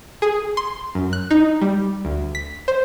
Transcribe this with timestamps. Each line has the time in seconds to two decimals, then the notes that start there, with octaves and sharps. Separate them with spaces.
0.22 G#4
0.57 C6
0.95 F#2
1.13 F#6
1.31 D#4
1.61 G3
2.05 D2
2.35 B6
2.68 C5